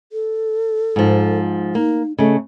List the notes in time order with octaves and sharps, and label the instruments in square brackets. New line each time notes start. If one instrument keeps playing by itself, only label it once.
[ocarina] A4
[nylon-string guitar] G#2 F3
[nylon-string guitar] A#3 [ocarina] D#4
[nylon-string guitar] C#3 A3 [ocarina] D#5